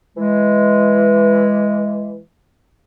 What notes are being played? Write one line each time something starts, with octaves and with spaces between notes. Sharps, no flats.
E3 G#3